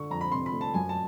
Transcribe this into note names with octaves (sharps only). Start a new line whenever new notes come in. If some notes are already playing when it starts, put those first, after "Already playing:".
Already playing: D3 C#6
F2 A#5
B5
C3 C6
B5
A3
A5
F#2 G#5
A5